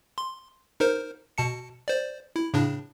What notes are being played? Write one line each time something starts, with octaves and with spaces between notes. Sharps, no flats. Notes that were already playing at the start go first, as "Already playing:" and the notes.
C6
D#4 A#4 C5
B2 A5 C#7
C5 D5
E4
A2 C#3 D4